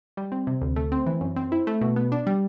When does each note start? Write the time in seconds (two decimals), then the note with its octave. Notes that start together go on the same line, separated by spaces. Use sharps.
0.17 G3
0.32 C4
0.47 C3
0.61 D2
0.76 A3
0.92 C4
1.06 E3
1.21 F#2
1.36 C4
1.52 E4
1.67 A3
1.81 B2
1.96 B3
2.12 D4
2.27 G3